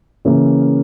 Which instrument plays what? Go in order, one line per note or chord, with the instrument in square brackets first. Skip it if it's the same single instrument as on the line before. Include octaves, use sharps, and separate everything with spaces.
[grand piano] C#3 E3 A#3 C#4 E4